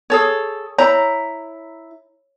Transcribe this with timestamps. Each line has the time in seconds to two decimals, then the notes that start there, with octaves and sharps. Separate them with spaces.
0.10 G#4 A4 C#5
0.78 E4 C#5 A#5